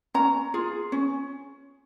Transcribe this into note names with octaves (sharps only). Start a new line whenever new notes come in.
C#4 A#5
F4 G#4
C#4